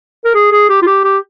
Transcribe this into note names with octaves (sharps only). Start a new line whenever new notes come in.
A#4
G#4
G#4
G4
F4
G4
G4